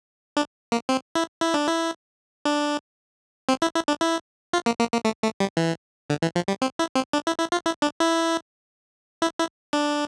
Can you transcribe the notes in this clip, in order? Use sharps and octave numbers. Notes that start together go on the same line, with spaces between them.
D4
A#3
C4
E4
E4
D4
E4
D4
C4
E4
E4
D4
E4
F4
A#3
A#3
A#3
A3
A3
G3
E3
D3
E3
F3
G3
C4
E4
C4
D4
E4
E4
F4
E4
D4
E4
E4
E4
D4